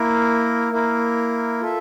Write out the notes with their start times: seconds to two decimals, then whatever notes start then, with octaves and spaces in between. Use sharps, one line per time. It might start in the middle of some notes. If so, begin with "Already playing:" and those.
Already playing: A#3 E4 A#4
0.72 A#3 E4 A#4
1.61 F4 A4 E5